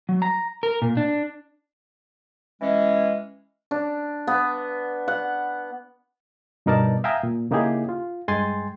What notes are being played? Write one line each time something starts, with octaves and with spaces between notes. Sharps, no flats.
F#3
A#5
A#4
A#2
D4
E3 G#3 C#4
D4
B3
F#5
G2 B2 D#4 A#4 D5 A5
E5 F5 G5 G#5 A#5 D#6
A#2
C#3 A#3 D#4 E4 G4 G#4
F4
G2 G#3 G5 G#5 C6 A6